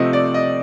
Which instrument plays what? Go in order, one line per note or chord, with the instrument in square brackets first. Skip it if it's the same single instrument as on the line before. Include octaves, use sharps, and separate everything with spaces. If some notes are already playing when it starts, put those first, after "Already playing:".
Already playing: [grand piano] C3 F3 A3 C4 D#5
D5
D#5